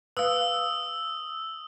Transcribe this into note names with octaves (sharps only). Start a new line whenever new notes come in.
B4 F5 D#6 E6